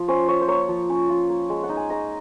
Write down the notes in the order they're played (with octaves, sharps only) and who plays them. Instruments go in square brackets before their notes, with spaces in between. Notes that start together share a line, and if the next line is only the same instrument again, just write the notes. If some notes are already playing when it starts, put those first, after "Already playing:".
Already playing: [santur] F3
C#4 C5
F4 C#5
C5
A#3 C#5
F3
C#4
F4
A#3
G#3
F#5
D#4
G#5
G#3 A#5